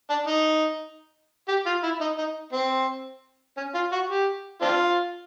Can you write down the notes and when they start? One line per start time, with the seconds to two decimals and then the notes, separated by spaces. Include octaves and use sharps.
0.10 D4
0.27 D#4
1.48 G4
1.66 F4
1.83 E4
2.01 D#4
2.18 D#4
2.53 C4
3.57 C#4
3.74 F4
3.92 F#4
4.09 G4
4.61 C4 D4 F4